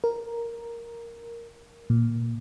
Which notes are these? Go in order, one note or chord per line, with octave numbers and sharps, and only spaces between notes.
A#4
A#2